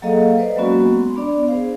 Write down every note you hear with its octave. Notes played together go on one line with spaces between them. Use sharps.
F#3 A#3 G#4 A4 D#5 F5
B4 C5 D5 D#5
F#3 G#3 A#3 B3 C#4 F#4
C6
B3 D4 D5
G#4 C5 F5